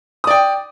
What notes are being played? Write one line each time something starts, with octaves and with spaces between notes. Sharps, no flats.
D5 G5 D#6